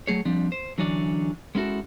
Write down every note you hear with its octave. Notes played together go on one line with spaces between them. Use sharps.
F#3 A3 G#4 C#5
F3 G3 C4 D4
C5
D3 E3 F#3 C#4 D4 D5
G#3 B3 C#4 E4 F#4 A4